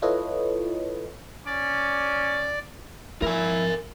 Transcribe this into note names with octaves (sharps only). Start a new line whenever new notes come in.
E4 F4 A4 B4 C#5 D#5
C#4 D5
F3 E4 A#4 G#5